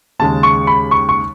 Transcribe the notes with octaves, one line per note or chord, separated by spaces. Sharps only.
D#2 C#3 G#3 A5
C#6
B5
C#6
C#6